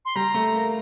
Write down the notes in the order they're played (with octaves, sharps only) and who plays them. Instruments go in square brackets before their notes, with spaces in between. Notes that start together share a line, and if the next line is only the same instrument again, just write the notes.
[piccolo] C6
[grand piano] G3 [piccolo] A#5
[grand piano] A3
A#3